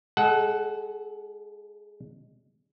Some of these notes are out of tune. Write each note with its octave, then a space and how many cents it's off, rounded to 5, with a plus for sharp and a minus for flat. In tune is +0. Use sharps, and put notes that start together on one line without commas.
G#3 +0 A4 -30 F#5 +10